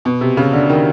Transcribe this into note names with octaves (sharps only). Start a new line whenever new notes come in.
B2
C3
C#3
D3
D#3